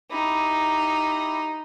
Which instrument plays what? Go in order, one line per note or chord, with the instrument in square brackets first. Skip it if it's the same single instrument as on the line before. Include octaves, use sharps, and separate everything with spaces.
[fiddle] D#4 [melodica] E4 G4 B5